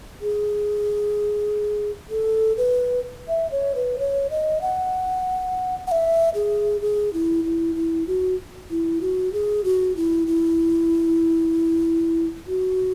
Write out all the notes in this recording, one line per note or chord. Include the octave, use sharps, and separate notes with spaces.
G#4
A4
B4
E5
C#5
B4
C#5
D#5
F#5
F#5
E5
G#4
G#4
E4
E4
E4
F#4
E4
F#4
G#4
F#4
E4
E4
F#4